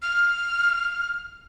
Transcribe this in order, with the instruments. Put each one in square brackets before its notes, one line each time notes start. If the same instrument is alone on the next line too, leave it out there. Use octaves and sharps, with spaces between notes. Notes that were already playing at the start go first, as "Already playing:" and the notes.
[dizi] F6